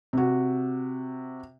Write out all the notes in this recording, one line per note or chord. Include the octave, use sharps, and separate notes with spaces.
C3 F#4